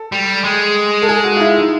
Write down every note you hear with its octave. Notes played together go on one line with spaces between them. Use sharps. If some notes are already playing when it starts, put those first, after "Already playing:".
Already playing: A4
G3
G#3
A4
G#4
F#4
F4
E4
D#4